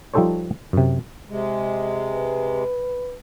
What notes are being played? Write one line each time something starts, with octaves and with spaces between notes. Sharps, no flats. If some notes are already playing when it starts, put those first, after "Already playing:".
F3 G3 D#4 A4 C5 C#5
F#2 C3
C3 G#3
B4